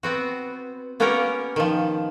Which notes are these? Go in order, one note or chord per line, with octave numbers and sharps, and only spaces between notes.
B3 C4 F#4
A#3 B3 C#4 G4 A#4 C#5
D#3 F3